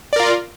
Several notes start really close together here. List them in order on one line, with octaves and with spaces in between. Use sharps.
D5 A#4 F4